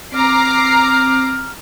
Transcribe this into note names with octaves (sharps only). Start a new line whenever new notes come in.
C4 A#5 D6 F6 C7